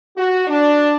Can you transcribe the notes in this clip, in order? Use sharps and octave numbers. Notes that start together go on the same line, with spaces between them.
F#4
D4